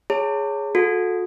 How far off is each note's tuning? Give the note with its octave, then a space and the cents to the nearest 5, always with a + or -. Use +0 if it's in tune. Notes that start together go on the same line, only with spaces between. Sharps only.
G#4 +0 C#5 +0 A5 +45
F#4 -35 A4 -10